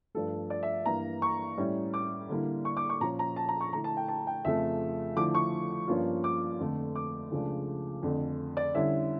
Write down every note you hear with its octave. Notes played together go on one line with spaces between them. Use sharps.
G2 F3 A3 A4
D5
E5
G2 E3 A#3 A#5
C#6
A2 G3 C#4 E4
D6
D3 G3 A#3 E4
C#6
D6
C#6
A#2 F3 C#4 A#5
A#5
A5
A#5
C#6
D3 A3 E4 A#5
A5
G5
A5
G5
F2 C#3 F3 A3 E5
D3 F3 A3 E4 D6
C#6
G2 F3 A#3 C#4 F4
D6
F2 D3 A3
D6
C#2 C#3 F3 A3 D4
F2 D3 A3
D5
D3 G3 C#4 E4 E5